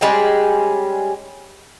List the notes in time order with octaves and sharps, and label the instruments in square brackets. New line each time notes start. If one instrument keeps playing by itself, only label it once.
[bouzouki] G3 G#3 C#4 G5